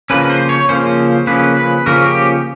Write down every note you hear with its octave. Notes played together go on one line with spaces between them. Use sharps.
C#3 F3 A#3 C#4 B4
C5
C#5
C#3 F3 A#3 C#4 C5
C#3 F3 A#3 C#4 B4
B4
C#3 F3 A#3 C#4 A#4
G4